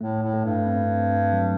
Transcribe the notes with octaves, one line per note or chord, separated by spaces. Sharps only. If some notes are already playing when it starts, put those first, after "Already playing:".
A2 A3
A2
A3
G2
C4
C4
F#3